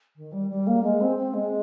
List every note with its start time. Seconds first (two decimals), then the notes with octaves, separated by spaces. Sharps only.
0.16 D#3
0.32 G3
0.49 G3
0.66 A#3
0.82 G#3
1.00 C4
1.16 C4
1.33 G#3